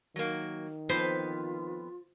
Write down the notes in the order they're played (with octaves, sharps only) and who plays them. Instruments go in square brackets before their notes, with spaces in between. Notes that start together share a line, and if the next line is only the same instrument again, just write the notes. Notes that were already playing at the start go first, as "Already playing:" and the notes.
[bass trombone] D#3 [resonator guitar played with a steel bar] F#3 A#3
[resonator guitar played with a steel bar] F2 B3 B4 [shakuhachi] F4 [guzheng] C5